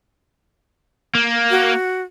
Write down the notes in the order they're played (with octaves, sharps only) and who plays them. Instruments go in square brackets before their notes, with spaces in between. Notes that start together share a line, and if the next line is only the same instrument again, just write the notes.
[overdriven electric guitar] A#3
[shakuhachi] F#4